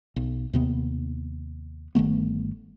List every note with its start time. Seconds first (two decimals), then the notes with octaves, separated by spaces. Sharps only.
0.16 B1
0.53 D#2 C3 B3
1.95 G1 D#3 A3 B3